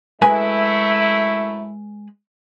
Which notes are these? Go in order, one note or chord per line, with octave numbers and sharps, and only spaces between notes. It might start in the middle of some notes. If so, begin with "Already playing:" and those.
F#2 G#3 A3 E4 B4 G#5